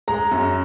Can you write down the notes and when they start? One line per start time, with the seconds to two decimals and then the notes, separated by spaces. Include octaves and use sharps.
0.08 G#3 A#5
0.31 F#2